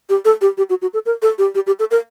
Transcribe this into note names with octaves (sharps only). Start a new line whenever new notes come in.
G4
A4
G4
G4
F#4
F#4
A4
A#4
A4
G4
G4
G4
A4
A#4